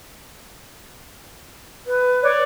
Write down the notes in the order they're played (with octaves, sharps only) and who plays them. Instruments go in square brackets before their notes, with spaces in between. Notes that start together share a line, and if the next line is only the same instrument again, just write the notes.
[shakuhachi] B4
[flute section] C#5 D5